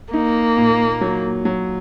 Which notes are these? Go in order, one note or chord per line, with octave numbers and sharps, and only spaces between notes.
A#3 D#4
A#2
F#3
F#3